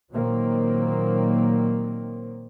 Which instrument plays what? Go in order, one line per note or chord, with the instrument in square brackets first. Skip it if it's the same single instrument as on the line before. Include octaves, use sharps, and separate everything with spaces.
[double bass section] A#2 D#3 F#3 A#3 C4